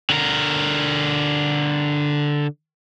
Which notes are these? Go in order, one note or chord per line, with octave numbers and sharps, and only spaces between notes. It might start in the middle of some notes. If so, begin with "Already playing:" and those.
D3 A#4